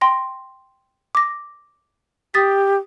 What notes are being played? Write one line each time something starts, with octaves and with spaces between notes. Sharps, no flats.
G5 C6 A#6
D6 A#6
G4 D#6 A6 B6